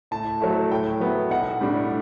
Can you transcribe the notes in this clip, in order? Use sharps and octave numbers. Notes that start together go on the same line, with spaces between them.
A2 A5
F#3 A3 E4
A2 G5
F#3 B3 E4
B1 F#5
A2 G3 D4